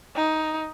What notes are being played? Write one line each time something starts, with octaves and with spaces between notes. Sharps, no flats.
D#4